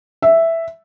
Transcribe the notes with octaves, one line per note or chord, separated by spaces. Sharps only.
E5